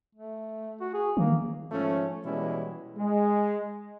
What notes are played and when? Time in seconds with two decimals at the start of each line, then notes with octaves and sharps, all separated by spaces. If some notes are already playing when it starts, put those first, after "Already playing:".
0.15 A3
0.80 F#4
0.94 G#4
1.17 D#3 A#3
1.72 G#2 F3 A3 C#4
2.24 B2 E3 G3 G#3 C#4 E4
2.97 G#3